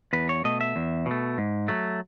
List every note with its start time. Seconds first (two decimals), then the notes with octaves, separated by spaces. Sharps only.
0.13 E2 B4
0.29 C#5
0.44 B2 A3 D#5
0.61 E5
0.76 E2
1.06 B2 A3
1.38 G#2
1.68 F#3 A3